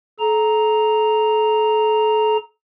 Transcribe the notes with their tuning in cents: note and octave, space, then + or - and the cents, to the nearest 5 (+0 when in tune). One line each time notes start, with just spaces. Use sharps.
A4 -40 A#5 +0